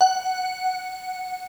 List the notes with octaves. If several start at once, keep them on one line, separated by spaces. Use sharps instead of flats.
F#5